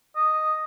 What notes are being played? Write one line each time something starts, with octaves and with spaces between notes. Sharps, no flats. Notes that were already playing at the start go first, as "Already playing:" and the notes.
D#5